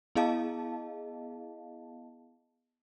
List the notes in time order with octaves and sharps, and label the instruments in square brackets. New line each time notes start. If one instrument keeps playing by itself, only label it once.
[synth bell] B3 E4 G#4 D#5 F5 A5